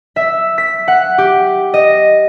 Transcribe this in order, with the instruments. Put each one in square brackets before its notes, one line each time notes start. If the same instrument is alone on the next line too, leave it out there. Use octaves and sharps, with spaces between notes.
[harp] E5
B6
F#5
G4
D#5